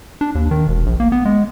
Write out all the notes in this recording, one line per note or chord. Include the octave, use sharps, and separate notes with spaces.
D4
D#2
D#3
E1
A#1
A#3
B3
G#3